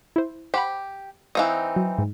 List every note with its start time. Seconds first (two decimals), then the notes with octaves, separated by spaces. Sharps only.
0.16 E4 C5
0.54 G4 C5 F#5 B5
1.35 E3 C4 D#4 F5 D#6
1.76 F#3
1.98 G#2